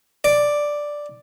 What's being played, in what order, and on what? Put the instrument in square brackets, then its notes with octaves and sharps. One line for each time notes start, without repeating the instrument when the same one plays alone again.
[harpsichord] D5